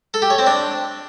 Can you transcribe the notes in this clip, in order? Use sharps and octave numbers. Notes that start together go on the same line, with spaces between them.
A4
G4
C#5
C4
D4